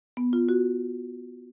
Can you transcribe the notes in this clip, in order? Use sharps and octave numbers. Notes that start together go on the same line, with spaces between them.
B3
F4
F#4